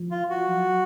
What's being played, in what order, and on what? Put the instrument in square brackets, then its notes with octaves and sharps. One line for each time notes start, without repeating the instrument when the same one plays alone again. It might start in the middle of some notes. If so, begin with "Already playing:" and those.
Already playing: [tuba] F3
[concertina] F4
F#4
[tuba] F#3